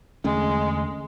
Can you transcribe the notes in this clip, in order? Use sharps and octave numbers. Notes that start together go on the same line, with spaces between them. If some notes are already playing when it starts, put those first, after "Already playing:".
E2 D3 G#3 A3 C#4